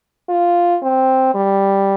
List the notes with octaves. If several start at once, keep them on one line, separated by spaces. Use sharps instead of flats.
F4
C4
G3